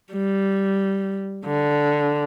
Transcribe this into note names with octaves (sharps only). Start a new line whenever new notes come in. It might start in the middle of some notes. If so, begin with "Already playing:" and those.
G3
D3